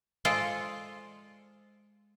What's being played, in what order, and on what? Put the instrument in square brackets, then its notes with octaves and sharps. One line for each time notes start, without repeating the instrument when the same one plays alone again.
[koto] G#3 F4 A4 C5 D5